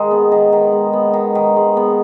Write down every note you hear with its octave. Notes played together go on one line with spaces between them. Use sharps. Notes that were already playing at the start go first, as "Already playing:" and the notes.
Already playing: D#3 G#3
B3
D#3
D#3
G#3
B3
D#3
D#3
G#3
B3